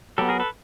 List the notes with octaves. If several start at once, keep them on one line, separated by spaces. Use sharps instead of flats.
F#3 B3 G4 A4
G#4 A#4
A4 B4